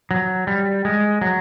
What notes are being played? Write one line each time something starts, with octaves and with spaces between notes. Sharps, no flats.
F#3
G3
G#3
F#3